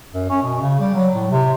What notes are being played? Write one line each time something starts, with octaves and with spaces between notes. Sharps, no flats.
F#2
C#4
B2
C#3
G3
F#3
A2
C3